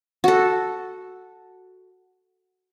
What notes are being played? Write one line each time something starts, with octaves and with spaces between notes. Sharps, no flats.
F#4 A4